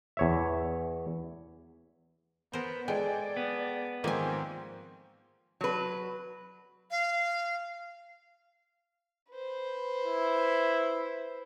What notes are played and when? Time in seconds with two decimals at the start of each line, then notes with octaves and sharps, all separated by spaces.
0.17 E2 C#5 E5
2.53 B3 A#4 C5
2.88 G#3 G#4 A4 D5 G5
3.37 B3
4.04 G#2 D#3 F3 A#3 C4 G#5
5.61 F#3 B4
6.91 F5
9.32 B4 C5
10.04 E4